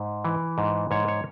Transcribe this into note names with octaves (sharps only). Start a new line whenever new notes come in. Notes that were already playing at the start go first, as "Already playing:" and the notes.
Already playing: G#2
E3
G#2
G#2 C#5
C#5